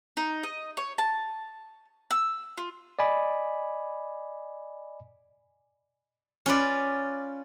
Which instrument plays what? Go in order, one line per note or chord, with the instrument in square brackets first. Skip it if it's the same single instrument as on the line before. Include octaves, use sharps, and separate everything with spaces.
[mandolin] D#4
D#5
C#5
A5
E6
F4
[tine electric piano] D5 D#5 G#5 B5 D6
[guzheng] C#4 F4 B4 D5